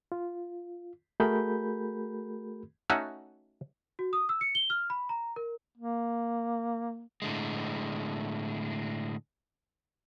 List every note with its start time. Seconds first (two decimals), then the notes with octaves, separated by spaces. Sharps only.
0.12 F4
1.20 A3 F#4 G#4 A#4 B5 G6
2.90 A3 C#4 D#4 F#4 E5 F#5
3.99 F#4
4.13 D#6
4.29 E6
4.41 C#7
4.55 G7
4.70 F6
4.90 B5
5.09 A#5
5.36 A#4
5.77 A#3
7.22 A2 D3 G#3